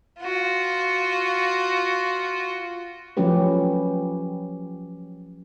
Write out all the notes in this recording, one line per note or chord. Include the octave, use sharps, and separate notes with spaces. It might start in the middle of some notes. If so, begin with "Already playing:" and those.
F4 F#4
F3 F#3 A3 C#4 G4 B4